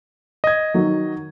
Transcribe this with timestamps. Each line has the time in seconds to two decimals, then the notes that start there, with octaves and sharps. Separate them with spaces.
0.44 D#5 G#6
0.74 D#3 F#3